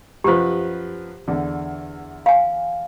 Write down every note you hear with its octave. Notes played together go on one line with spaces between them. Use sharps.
F#2 F3 G4 B4 C5
E2 D3
F5 G#5